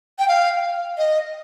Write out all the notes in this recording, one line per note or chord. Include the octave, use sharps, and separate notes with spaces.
G5
F5
D#5